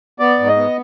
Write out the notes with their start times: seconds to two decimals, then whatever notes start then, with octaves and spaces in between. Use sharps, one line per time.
0.19 B3 D5
0.39 G#2
0.48 D#5
0.57 B3